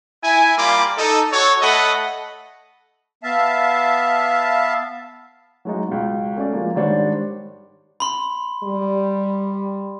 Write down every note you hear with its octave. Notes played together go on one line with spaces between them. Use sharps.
E4 G#5
G3 A#3 F4 B5 D6
D#4 A4
F#4 A4 C#5
A3 A4 D#5 F#5 B5
B3 E5 F5 A5
F#3 G#3 D#4
C#2 B2
A3 C#4 F#4 D5
F3 G#3 A#3
G#2 D#3 G3 D4 C5 C#5
B5 C6
G3